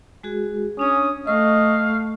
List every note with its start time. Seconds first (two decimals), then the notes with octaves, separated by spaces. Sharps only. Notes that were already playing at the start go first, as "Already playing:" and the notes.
0.23 G#3 F#4 G#4
0.79 C#4 D4 G#5 D#6
1.27 A3 D#5 F5 C#6